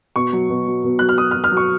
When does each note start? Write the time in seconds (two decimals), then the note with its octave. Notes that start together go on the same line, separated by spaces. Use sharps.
0.16 B2 C#6
0.33 F#3
0.50 B2
0.67 F#3
0.84 B2
0.99 F#3 F#6
1.09 F6
1.18 F#3 D#6
1.31 F6
1.35 F#3
1.44 F6
1.51 F#3
1.57 C#6